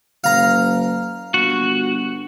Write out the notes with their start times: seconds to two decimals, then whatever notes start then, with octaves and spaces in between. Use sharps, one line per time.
0.24 F#1 F5 A#5
1.34 G1 F#4